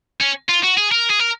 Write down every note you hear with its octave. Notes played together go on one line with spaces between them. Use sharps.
C#4
F4
F#4
G#4
A#4
G#4
A#4